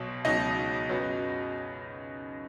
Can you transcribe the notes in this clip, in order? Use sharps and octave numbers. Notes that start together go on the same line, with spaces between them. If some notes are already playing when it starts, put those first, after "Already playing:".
Already playing: B1 B2 F#3
C#2 B2 F#3 D#4 D#5
F#2 F#3 B3